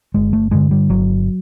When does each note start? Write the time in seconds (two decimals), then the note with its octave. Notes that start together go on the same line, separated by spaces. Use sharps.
0.14 G1 G#3
0.33 A3
0.51 G2 D3 G#3
0.71 G3
0.89 G1 F#3